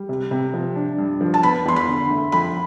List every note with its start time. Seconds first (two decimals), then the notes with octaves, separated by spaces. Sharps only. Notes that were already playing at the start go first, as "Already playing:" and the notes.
Already playing: G3
0.09 C3
0.31 C3
0.54 F3
0.76 D4
0.98 G2
1.21 F3
1.34 A5
1.43 B3 B5
1.65 E2 C6
1.76 B5
1.88 D3
2.10 A3
2.32 F2 B5